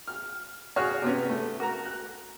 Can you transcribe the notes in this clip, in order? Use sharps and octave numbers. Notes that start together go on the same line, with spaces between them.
F6
F#4 G#4 C#5 F6 F#6
C3 B3 C#4
A3
F#4 A#4 A#5
F#6